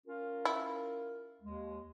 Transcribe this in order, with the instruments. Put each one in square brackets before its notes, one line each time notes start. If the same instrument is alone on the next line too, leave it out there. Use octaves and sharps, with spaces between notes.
[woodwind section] C#4 F4 A#4
[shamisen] E4
[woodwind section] D#2 G#3